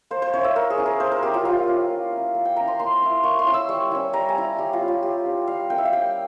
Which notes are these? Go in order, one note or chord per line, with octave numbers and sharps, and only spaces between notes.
A#3 C5
C5
C#4 E4 C#5
E5
A#3 A#4
G#4
C#4 E4
A#4
A#3 C5
A#4
C#4 E4 G4
F4
A#3 F4
C#4 E4
A#3
C#4 E4
A#3
G5
C#4 E4 A#5
C6
A#3 C6
C#4 E4
A#3 C#6
C6
C#4 E4
E6
G3 C#6
C#4 E4
G3 A#5
G#5
C#4 E4
G3 G4
F4
C#4 E4
F4
G3 G4
C#4 E4
G3 F5
A#3 C#4 E4 G5
E5
F5
G3 G5